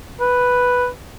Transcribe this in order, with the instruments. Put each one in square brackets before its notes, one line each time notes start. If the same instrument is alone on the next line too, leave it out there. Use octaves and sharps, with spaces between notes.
[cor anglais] B4